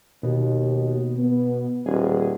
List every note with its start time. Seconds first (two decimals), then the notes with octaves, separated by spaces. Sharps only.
0.23 D#2 B2
1.19 B3
1.86 D#1 G#4